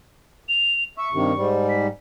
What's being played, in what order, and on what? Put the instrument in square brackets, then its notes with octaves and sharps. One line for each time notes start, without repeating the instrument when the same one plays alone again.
[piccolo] F7
[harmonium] E5 [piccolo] C#6
[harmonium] G2 C3 D#3
G#2 G3
[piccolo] B6